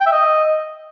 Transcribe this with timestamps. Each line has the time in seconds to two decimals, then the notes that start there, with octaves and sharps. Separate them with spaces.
0.01 G5
0.06 E5
0.12 D#5